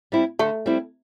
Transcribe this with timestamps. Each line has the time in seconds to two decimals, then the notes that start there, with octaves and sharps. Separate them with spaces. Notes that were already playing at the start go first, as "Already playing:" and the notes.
0.12 G3 C4 E4
0.39 D3 A3
0.66 G3 C4 E4